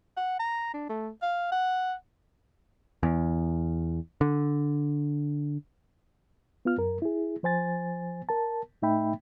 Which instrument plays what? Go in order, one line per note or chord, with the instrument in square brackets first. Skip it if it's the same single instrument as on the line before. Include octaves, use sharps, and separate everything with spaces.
[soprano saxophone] F#5
A#5
D4
A3
F5
F#5
[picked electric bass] E2
D3
[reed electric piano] B3 F4 F6
F#2 A#4
E4 G#4
F3 C5 G#5 A6
A#4 A5
A2 A3 D#4 E5 G5 B5